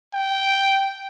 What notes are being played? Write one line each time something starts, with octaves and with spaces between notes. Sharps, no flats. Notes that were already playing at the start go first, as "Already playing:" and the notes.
G5